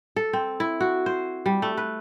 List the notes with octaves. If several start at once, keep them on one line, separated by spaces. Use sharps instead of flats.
A4
C4
E4
F#4
C5
G3
A3
B4